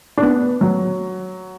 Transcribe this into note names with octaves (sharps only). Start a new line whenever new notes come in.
D4
B3
F#3